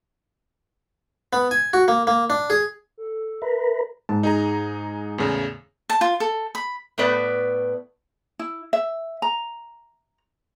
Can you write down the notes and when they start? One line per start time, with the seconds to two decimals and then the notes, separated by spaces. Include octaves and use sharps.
1.33 B3
1.51 G#5
1.73 F#4
1.88 A#3
2.07 A#3
2.30 D4
2.50 G#4
2.97 A4
3.42 A#4 B4 E5
4.09 G#2 A5
4.23 D#4 G#4 A#5
5.18 E2 A2 C#3
5.90 A5
6.01 F4
6.20 A4
6.55 B5
6.98 A2 A3 B3 B4 D5
8.39 E4
8.73 E5
9.22 A#5